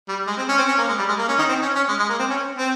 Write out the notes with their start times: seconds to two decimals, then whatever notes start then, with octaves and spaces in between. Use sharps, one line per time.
0.08 G3
0.27 G#3
0.38 C4
0.48 C#4
0.58 C4
0.68 C#4
0.78 A#3
0.88 G#3
0.98 G3
1.08 G#3
1.18 A#3
1.28 C#4
1.38 D#3 D#4
1.49 C4
1.62 C#4
1.75 C#4
1.88 G#3
1.99 G#3
2.09 A#3
2.19 C4
2.29 C#4
2.58 C4